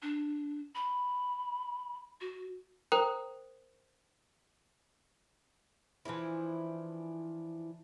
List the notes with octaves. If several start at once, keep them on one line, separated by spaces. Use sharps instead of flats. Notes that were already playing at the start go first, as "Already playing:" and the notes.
D4
B5
F#4
A#4 C5 G5 A#5 D#6 F#6
E3 F3 D4 E4